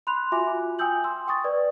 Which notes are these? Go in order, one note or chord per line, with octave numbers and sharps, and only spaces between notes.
B5 C6 F#6 F7
F4 F#4 E5 G#5 D6
G5 G#5 D#6 E6 G6 F#7
C6 E6
G5 C#6 D#6 A6
B4 D5